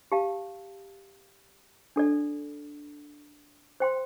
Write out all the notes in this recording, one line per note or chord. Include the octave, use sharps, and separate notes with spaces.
G4 F5 A5
D4 A4 D5
C5 G5 C6